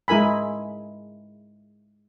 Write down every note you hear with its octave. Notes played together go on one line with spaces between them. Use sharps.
G#3 E4 A#4 G#5 B5